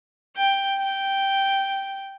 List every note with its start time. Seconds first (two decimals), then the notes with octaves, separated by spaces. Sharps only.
0.37 G5
0.79 G5